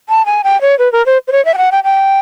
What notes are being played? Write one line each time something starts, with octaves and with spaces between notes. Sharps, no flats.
A5
G#5
G5
C#5
B4
A#4
C5
C5
C#5
E5
G5
F#5
G5
G5